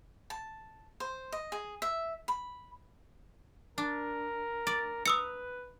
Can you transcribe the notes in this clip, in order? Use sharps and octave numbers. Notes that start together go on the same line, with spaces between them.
A5
C5
D#5
G#4
E5
B5
D4 A#4
D5
B4 A#5 D#6 E6 C#7